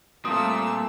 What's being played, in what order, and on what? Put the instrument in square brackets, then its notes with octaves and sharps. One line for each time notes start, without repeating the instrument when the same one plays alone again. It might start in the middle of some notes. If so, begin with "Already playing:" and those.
[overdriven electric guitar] A#2 [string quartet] G3 A4 E6 [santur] A3 C4 [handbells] D#6